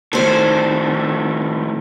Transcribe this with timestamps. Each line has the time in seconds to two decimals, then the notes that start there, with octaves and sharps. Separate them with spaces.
0.13 A2 D#3 A4 C5